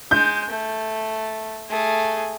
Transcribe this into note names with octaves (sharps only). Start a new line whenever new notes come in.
G#3 G6
A3
A3 G#4